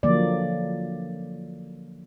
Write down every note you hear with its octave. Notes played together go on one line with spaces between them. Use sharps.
D3 F3 F#3 A#3 D5